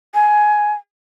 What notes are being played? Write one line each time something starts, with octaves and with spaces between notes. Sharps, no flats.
G#5